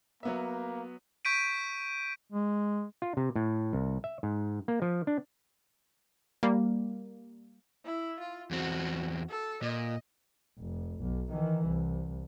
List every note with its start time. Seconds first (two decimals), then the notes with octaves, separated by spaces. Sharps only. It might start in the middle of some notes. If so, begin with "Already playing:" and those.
0.23 F#3 A#3 B3 E5
1.25 C#6 G6 B6 D7 D#7
2.32 G#3
3.02 F4
3.17 C3
3.36 A2
3.73 C2
4.04 E5
4.23 G#2
4.68 A#3
4.82 F3
5.07 D4
6.43 G3 A#3
7.85 E4
8.20 F4
8.51 E2 C4 F#4
9.29 A4
9.63 A#2 D#5
10.58 F1
10.99 B1
11.30 D#3 E3
11.67 C2